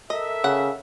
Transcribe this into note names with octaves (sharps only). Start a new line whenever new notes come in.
A4 A#4 D#5 E5
C#3 F#5